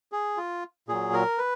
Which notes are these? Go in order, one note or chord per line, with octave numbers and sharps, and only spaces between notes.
G#4
F4
A#2 F#3 G#4
A#4
B4